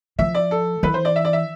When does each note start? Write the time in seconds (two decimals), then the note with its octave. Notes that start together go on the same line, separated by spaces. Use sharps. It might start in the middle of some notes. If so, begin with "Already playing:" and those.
0.19 F3 E5
0.35 D5
0.51 A4
0.83 E3 B4
0.94 C5
1.05 D5
1.16 E5
1.25 D5
1.33 E5